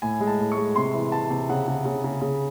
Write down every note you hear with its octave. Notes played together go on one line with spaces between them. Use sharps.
A2 G#5
G#3
A5
A2
C#6
G#3
C3 C6
E3
C3 A5
C3
C#3 F#5
C#3
C#3
C#3
C#3